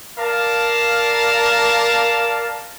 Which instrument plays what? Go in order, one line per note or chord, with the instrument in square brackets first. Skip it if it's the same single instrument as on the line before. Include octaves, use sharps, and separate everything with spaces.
[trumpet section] A#4 D5 F5 A5